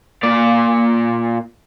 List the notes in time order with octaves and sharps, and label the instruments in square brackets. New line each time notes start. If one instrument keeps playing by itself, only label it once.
[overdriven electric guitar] A#2 D5